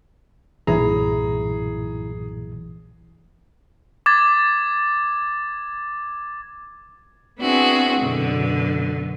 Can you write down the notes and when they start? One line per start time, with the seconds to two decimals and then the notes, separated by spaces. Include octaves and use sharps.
0.67 B1 G2 A#2 E3 E4 G#4 A#5
4.06 D6 G#6 A6
7.39 B3 C4 D4 E4 F#4 G#4
8.00 F#2 B2 D3